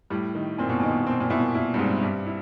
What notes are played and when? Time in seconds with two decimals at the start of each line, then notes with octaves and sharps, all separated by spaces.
0.10 A2 G3
0.35 D#3
0.58 A#2 C4
0.69 B2
0.80 A#2 D#3
0.89 B2
1.00 A#2
1.07 B2 C4
1.20 A#2
1.30 B2 E4
1.40 A#2
1.55 A#2 E4
1.74 G2
1.79 G#2 C4
2.03 G2 G3
2.27 E4